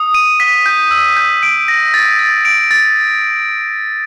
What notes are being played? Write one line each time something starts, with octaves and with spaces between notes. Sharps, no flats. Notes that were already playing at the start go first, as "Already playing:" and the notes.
Already playing: D#6
D#7
B6
G6
E6
G6
D7
A#6
A6
A6
D7
A6